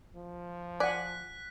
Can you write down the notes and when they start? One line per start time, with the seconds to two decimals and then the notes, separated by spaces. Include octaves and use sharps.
0.15 F3
0.80 D5 F#5 G#5 F#6 B6